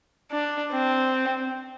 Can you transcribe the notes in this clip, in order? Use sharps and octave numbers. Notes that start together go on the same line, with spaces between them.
D4
C4